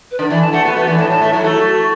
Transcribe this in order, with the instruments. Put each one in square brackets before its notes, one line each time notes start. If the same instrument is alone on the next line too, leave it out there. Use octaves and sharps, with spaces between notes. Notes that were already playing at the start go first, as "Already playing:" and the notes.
[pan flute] B4
[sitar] D3 [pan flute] D5
[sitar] E3 [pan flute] D5
[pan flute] A5
[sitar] A3 [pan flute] F#5
[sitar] B3 [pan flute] F#4
[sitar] A3 [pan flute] B4
[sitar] E3 [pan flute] D5
[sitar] A2 [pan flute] A5
[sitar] A2 [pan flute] A5
[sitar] A3 [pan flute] E5
[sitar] F#3 [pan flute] E4
[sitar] A3 [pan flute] A4
[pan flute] F#4